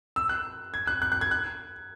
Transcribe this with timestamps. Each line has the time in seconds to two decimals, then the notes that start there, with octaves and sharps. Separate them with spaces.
0.16 E6
0.29 F#6
0.74 G#6
0.87 F#6
1.02 F#6
1.12 F#6
1.21 G#6
1.31 F#6